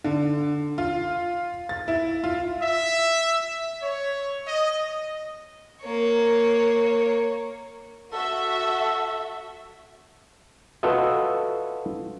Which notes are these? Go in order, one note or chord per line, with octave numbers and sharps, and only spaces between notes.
D3
F4
A6
E4
F4
E5
C#5
D#5
A#3 C#5
F#4 A4 E5
F4 F#4 A4 B4 D#5 E5